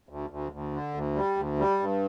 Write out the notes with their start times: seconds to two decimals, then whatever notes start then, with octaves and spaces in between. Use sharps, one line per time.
0.09 D2
0.30 D2
0.52 D2
0.73 D3
0.94 D2
1.15 G3
1.37 D2
1.59 G3
1.80 G2